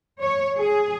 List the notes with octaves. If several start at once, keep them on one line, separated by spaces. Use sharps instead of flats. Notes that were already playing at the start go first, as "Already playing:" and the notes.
C#5
G#4